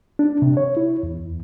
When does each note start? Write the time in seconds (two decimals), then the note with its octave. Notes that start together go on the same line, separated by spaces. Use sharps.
0.19 D4
0.42 C3
0.57 C#5
0.77 E4
1.03 E2